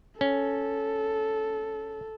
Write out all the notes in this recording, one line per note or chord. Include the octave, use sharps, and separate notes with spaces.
C#4 A4